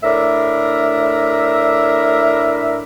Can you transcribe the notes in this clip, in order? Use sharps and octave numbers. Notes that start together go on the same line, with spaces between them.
A2 D4 A#4 E5